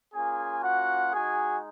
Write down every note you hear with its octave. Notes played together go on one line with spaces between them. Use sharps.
A#3 C#4 F4 G#4 G#5
F#4 F#5
G#3 D#4 F#4 G#4 G#5